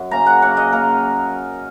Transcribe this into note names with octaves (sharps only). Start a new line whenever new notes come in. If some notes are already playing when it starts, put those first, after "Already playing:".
Already playing: F#2 F#3
C#3 A#3 C#4 A#5
F#5
C#3 A#3 C#4 F#5
D#5
C#3 A#3 D#4 A#4